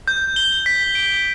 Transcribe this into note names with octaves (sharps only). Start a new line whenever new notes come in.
G6
G7
B6
D7